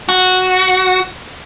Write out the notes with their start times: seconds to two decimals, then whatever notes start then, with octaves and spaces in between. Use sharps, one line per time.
0.09 F#4